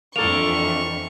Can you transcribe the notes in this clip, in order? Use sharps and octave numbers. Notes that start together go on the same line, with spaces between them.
F2 E3 A#3 D4 A4 C#6 F7